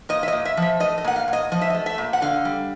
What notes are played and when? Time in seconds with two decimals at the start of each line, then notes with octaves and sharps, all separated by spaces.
0.09 A#2 D#5
0.23 E5
0.28 D#5
0.33 A#2
0.45 E5
0.57 F3 E5
0.80 A3 D#5
0.98 D#5
1.04 A#2 F#5
1.16 F5
1.28 A#2
1.33 D#5
1.52 F3 D#5
1.61 E5
1.70 D#5
1.75 A3
1.86 E5
1.98 A#2
2.13 F#5
2.22 D3 F5
2.45 G3